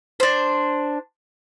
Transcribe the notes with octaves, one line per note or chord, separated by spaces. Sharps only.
D4 C5